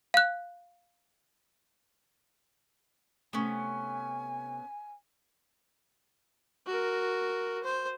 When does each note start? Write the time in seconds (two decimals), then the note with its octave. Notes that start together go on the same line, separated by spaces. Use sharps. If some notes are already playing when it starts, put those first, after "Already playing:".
0.14 F5 F#6
3.33 C3 A3 B3 C#4 G#5
6.67 F#4 A#4
7.63 C5